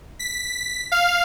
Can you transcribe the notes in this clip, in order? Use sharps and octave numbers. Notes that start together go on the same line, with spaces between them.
B6
F5